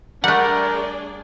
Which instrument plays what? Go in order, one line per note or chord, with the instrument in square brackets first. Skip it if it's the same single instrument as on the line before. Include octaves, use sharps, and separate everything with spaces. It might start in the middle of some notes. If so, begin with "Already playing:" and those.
[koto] G3 A3 [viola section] D4 G#4 D5 [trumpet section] A#4 [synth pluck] F#5